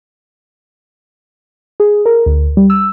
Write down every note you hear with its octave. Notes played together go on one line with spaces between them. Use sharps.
G#4
A#4
D2
G3
E6